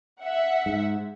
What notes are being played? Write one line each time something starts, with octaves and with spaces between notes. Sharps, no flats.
E5 F#5
G#2